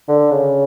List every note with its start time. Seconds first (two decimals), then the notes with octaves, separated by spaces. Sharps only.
0.08 D3
0.31 C#3